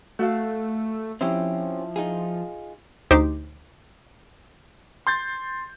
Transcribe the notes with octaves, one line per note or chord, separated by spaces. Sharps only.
A3 F#4 A4 F5
F3 C4 C#4 E4 G4
D#4 F4 G#4
D2 D#4 G4 C5 D6
C6 G6 A6